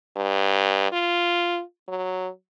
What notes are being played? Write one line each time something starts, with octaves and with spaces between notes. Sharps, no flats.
G2
F4
F#3